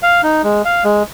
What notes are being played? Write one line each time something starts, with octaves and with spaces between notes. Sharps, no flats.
F5
D#4
G#3
F5
G#3